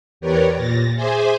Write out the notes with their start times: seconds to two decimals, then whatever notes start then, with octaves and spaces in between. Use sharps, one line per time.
0.21 E2 G4 A#4 B4 C#5 D5
0.54 A#2 A6 A#6
0.95 G#4 C5 E5 G#5 C6 D6